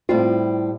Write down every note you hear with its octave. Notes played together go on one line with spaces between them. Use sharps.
A2 G3 C4 E4 F4